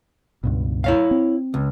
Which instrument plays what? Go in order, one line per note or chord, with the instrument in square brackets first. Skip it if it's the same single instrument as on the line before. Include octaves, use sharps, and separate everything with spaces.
[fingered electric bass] C#2 G2 B2
[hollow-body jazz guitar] E4 C#5 F5
[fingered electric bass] C4
[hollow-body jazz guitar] C#2